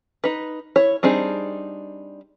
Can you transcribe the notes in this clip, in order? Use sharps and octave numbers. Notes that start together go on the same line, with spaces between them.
D#4 B4
E4 C#5
G3 C4 D4 D#4 G#4